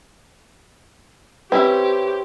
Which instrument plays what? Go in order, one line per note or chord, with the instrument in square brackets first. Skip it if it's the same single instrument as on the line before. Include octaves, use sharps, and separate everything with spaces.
[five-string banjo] C4 C#4 E4 [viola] G4 [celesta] B4